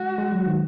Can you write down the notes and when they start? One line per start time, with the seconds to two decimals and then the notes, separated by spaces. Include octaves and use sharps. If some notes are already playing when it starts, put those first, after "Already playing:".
Already playing: G#3 F#4
0.18 G#3
0.32 F#3
0.46 D#3